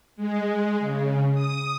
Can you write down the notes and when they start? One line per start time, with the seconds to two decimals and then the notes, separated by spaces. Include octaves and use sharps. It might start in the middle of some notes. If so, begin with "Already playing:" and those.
0.16 G#3
0.79 C#3
1.34 D#6